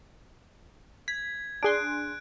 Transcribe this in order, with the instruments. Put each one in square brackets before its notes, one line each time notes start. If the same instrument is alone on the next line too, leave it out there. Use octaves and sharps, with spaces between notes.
[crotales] G#6 [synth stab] B6
[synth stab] D4 G#4 C6 [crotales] F#6 D7